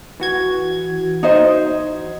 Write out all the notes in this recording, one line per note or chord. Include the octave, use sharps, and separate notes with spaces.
E3 F#4 G#6
D#4 C5 D#5